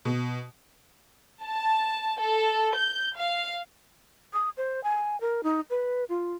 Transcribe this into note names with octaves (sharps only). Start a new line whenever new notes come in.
B2
A5
A4
G6
F5
D#6
C5
G#5
A#4
D#4
B4
F4